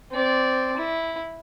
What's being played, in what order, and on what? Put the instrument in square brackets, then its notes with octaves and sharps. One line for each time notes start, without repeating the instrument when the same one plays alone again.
[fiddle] C4 D5
E4